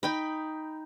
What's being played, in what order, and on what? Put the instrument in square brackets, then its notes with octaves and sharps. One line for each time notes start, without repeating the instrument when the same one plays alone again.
[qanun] D#4 G5 B5